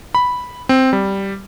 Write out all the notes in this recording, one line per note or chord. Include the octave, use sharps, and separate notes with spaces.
B5
C4
G3